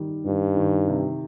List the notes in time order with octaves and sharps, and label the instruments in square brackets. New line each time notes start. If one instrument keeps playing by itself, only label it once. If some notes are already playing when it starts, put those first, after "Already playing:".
Already playing: [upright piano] D#3 G3
[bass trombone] G2 [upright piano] D#3
[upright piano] D#3
C3